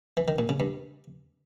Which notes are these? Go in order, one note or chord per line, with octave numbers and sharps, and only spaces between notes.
E3
D#3
A#2
C#3
G2